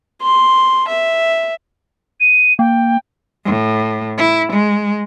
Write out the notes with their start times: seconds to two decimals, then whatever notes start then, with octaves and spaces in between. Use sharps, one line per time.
0.22 C6
0.88 E5
2.20 D#7
2.59 A#3 G5
3.46 A2
4.18 E4
4.53 G#3